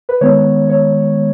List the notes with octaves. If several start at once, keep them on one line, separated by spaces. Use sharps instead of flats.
B4
D#3 G#3 B3 C#5
C#5